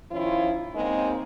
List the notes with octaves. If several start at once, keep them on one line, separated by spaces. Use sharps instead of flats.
D#3 F3 C#4 E4 F4 C#5
C#3 G#3 A#3 C4 D#4